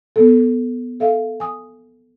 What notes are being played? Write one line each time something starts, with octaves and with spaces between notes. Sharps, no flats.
B3 A4
A4 E5 F5
G#5 D#6